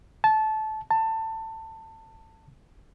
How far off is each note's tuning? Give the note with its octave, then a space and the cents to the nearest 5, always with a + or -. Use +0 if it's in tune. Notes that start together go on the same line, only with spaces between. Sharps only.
A5 -20
A5 +20